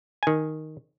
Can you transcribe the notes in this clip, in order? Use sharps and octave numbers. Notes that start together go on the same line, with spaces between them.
D#3 G#5